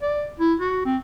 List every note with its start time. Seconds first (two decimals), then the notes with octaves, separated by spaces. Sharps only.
0.02 D5
0.40 E4
0.60 F#4
0.85 C4